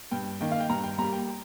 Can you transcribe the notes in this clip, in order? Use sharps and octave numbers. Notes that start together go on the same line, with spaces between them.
G2 G5
D#3 A#3 G5
F5
G5
G2 A#5
G5
G3 A#3 A#5
G5